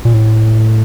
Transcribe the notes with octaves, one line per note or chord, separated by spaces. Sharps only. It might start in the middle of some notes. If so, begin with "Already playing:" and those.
A#2
A2